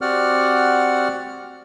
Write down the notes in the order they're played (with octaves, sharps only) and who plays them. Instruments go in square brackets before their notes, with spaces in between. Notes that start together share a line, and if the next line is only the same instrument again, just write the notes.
[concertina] C4 F#4 G4 D5 F#5 F6